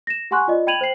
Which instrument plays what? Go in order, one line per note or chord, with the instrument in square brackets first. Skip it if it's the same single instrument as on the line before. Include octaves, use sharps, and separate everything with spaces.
[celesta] A#6 E7
G4 F#5 G#5 C6 C#6 F#6
F4 D5 D#5
G5 B5 G#6 D#7 F7 F#7
C5 G5 C7 F#7